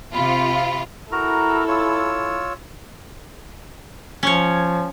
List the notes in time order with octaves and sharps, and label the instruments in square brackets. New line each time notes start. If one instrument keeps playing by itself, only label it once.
[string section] C3 F4 [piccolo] B5
[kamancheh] E4 A4 [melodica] F#4 A#4 A#5
[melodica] F4 C#5 E6
[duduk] F3 [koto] C#4 C#5